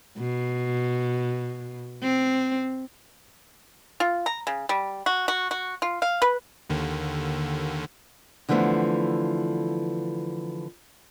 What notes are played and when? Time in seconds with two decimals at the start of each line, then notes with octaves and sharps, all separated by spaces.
0.17 B2
2.03 C4
4.00 F4
4.26 A#5
4.47 C#3
4.69 G3
5.06 F#4
5.28 F#4
5.51 F#4
5.82 F4
6.02 F5
6.22 B4
6.70 D#2 D3 D#3
8.49 D3 E3 F3 A3 B3 A4